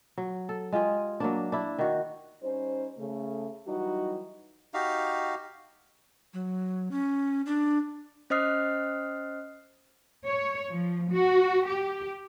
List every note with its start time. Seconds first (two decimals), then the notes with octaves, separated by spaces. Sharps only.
0.18 F#3
0.49 A4
0.72 G#3 F4 G4 G#4
1.20 F#3 A#3 D4
1.52 D4 E4
1.79 D#3 F#4
2.42 G3 C#4 D#4 C5
2.97 C#3 A3
3.67 E3 F#3 G3 D#4 F#4 D#5
4.74 D#4 F#4 G4 F5
6.34 F#3
6.91 C#4
7.46 D4
8.30 C#4 C5 D#5 D#6 F6 C7
10.26 C#5
10.71 F3
11.12 F#4
11.67 G4